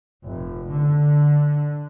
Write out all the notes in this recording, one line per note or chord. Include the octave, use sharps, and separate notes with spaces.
F1
D3